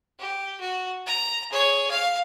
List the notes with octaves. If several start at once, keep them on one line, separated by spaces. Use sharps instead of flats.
G4
F#4
A#5
G#4 C#5
F5